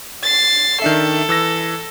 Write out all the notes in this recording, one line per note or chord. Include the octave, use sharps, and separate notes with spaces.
A6 C7
D#3 D4 A4 E5
E3 E6 A#6